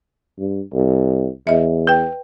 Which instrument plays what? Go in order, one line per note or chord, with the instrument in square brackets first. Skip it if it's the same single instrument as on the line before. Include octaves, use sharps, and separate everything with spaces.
[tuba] G2
C2
[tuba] E2 [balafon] D#5 E5
[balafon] B4 G5